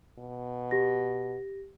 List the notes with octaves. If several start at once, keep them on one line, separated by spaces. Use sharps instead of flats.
B2
G4 A#6